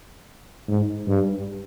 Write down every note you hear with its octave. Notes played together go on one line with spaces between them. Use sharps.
G#2
G2